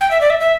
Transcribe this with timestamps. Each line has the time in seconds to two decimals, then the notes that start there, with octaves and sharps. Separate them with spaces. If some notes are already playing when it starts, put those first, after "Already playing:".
0.01 G5
0.11 E5
0.21 D5
0.30 E5
0.40 E5